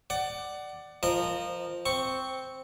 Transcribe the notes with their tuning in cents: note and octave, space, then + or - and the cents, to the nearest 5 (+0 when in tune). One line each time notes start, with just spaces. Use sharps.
D5 +10 F#5 +25
F3 +0 A#4 +0 D#5 -25
C4 +0 C#6 +0